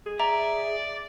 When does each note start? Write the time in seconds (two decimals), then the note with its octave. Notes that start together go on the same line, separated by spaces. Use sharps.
0.06 G#4
0.20 D5 E5 A#5